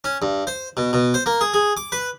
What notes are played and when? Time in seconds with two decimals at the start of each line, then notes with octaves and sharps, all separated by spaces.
0.04 C#4
0.22 G2
0.47 C5
0.77 B2
0.93 B2
1.14 C5
1.26 A#3
1.41 G#4
1.54 G#4
1.77 D6
1.92 B4